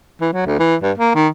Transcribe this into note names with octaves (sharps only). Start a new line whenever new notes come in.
E3
F#3
D2
E3
G2
A#3
D#3